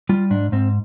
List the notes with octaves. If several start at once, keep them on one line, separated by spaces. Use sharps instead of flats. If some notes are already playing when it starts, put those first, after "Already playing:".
G3 F4
G#2 D4
G#2 C4